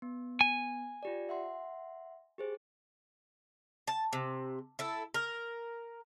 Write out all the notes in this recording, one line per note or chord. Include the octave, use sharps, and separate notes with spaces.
B3
G#5
F4 G4 D5
E5 F#5 C6
G4 G#4 C5
A5
C3
E4 A4
A#4